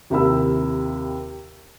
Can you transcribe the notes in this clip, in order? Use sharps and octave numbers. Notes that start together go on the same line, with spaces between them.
D#2 C3 E4 A#4 B5 E6